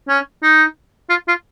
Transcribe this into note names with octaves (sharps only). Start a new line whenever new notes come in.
C#4
D#4
F4
F4